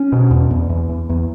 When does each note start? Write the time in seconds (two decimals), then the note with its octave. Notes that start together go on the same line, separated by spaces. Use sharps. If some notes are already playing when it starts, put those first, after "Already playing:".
Already playing: C#4
0.12 B2
0.31 E2
0.51 E2
0.70 E2
0.89 E2
1.10 E2